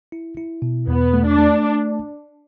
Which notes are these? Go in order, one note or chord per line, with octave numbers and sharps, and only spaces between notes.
E4
E4
B2
E2 B3
A3
D4
A3